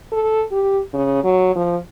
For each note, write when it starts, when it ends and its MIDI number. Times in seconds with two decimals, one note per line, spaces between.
0.12 0.43 69
0.52 0.80 67
0.94 1.23 49
1.24 1.54 54
1.56 1.77 53